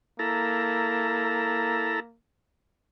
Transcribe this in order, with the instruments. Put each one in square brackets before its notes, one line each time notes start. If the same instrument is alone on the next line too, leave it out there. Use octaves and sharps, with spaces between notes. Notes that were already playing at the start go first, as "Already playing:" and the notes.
[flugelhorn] A#3 [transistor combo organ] E4 A4 A#5